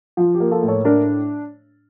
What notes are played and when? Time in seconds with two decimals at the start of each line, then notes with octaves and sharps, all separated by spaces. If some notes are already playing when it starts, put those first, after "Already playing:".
0.17 F3 F4
0.34 G4
0.40 A#3
0.51 F4 A4
0.62 A2
0.68 A4 C#5
0.85 D4 A#4 D5